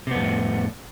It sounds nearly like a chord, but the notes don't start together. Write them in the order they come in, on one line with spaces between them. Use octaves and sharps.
C3 B3 F2 A2